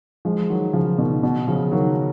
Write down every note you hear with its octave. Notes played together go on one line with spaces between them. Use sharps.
F3 G#3
D#3 F#3
C#3 F3
B2 D#3
B2
C#3 F3
D#3 F#3